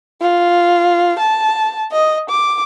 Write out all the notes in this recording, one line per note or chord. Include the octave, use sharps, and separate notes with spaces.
F4
A5
D#5
D6